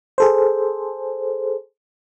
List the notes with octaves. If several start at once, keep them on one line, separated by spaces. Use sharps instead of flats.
G#4 A4 C5